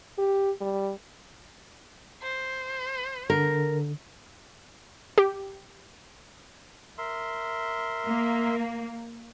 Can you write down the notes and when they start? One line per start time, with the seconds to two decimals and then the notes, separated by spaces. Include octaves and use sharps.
0.18 G4
0.61 G3
2.22 C5
3.30 D3 A#4
5.18 G4
6.98 A#4 E5 C6
8.08 A#3